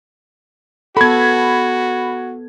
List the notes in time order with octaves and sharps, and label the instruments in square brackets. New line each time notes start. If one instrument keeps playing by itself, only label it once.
[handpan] B3 A4 [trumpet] F#4 [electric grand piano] B5 G#6